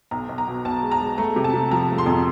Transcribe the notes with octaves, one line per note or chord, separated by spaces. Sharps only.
B1 A#5
B1
A#5
B2
B1 A5
G#3
A#5
G#3
A3 A#5
C3
A5
C3
F3 A#5
A3
C6
F2